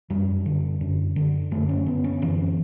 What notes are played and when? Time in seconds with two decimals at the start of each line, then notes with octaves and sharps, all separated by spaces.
0.10 F#2 G3
0.46 D3
0.81 F#2
1.16 D3
1.51 F#2 A3
1.69 C#4
1.86 D3 B3
2.04 C#4
2.22 F#2 E3